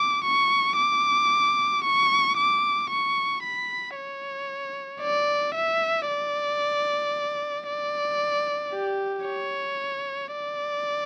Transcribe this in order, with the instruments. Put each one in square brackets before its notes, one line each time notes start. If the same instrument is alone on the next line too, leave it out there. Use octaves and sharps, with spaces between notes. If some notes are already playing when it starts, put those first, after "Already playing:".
Already playing: [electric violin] D6
C#6
D6
C#6
D6
C#6
B5
C#5
D5
E5
D5
D5
G4
C#5
D5